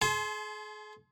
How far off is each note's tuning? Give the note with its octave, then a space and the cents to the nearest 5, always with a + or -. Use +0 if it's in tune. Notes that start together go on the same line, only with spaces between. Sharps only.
G#4 +40 A5 -40 C6 +0